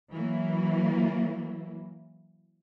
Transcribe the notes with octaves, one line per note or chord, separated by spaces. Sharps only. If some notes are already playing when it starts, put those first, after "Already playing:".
E3 F#3 A#3